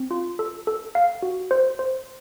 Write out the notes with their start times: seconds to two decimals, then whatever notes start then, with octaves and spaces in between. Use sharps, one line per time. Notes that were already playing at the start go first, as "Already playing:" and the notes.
Already playing: C4
0.11 F4
0.39 A4
0.67 A4
0.95 F5
1.22 F#4
1.51 C5
1.79 C5